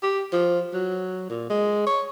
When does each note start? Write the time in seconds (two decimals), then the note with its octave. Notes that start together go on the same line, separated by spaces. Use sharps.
0.03 G4
0.33 F3
0.74 F#3
1.29 A#2
1.50 G#3
1.87 C#5